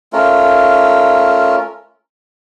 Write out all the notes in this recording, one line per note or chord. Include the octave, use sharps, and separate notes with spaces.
A3 C#4 F4 A#4